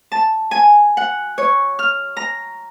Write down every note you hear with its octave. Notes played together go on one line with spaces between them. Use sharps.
A5
G#5
F#5
C#5
F6
A#5